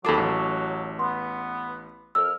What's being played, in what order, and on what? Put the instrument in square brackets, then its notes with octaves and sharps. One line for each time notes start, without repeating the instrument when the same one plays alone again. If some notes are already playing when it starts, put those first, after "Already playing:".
[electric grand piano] D#2 D6 [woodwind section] F#3 [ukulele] G#4 A4 B5
[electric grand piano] A1
[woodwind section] B3 [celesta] C6
[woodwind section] F2 F6 [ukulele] A#4 [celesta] E6